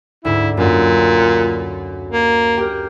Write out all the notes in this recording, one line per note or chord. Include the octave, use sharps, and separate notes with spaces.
D2 G#2 E4
F#2 A#2
A#3
G4 A#4